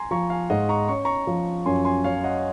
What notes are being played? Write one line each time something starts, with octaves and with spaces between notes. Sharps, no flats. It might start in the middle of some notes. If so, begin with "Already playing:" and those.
Already playing: G#5 A#5 C6
F3 A#5 C#6
F5 G#5
G#2 D#5 F#5
A#5 C#6
C#4 C#6
A#5 C#6
F3
F#2 G#5 C6
G#5 C6
C#4 C#5 F5
D#5 F#5